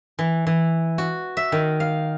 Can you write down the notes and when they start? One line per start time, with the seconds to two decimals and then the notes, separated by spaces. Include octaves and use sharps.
0.19 E3
0.47 E3
0.98 F#4
1.37 E5
1.52 D#3
1.80 F5